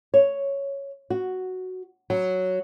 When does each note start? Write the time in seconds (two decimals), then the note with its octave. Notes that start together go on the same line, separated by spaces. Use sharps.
0.14 C#5
1.10 F#4
2.10 F#3